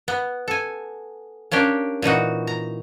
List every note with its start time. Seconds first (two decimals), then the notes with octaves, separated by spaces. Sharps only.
0.08 B3
0.48 A4 G#5
1.51 A#3 C#4 D4 G4
2.02 A#2 E3 D#4 F#4
2.47 A#5